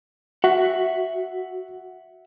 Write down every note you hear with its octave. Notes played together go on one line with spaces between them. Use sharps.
F#4 E5 F#5